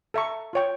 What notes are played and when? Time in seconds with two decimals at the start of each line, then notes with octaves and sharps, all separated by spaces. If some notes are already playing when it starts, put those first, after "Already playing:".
0.14 A4 E5 A#5 C#6
0.53 F4 C#5 G5 C#6